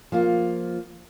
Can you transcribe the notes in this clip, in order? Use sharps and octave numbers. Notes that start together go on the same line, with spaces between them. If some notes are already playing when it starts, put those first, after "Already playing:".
F3 A#3 F4